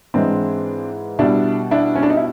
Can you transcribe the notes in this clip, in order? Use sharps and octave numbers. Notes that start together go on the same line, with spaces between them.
G#2 E3 G#3 C4 D4
B2 G3 D4 E4
D4 E4
C#4
D4
D#4
E4